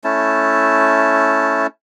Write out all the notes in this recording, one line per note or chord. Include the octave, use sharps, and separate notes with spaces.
A3 C#4 E4 A5